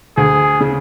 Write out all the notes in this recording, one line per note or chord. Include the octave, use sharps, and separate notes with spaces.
D2 G#4
C#3